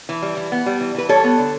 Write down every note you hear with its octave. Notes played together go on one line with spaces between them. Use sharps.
E3
G3
E3
B3
G3
E3
E3 B4
G3 A4 C#5
B3
D3